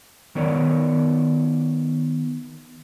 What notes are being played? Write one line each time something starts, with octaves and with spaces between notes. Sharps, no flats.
D#3 B3 D#4 A#4 C#5 D5